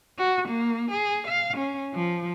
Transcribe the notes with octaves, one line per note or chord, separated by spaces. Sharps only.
F#4
A#3
G#4
F5
C#4
F3